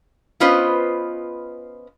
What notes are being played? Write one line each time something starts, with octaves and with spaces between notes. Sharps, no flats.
B3 C#4 F4 B4 C5 D#5